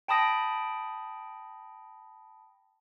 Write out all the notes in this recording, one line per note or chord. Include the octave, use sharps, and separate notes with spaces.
G5 A5 B5 D#6 A#6 D7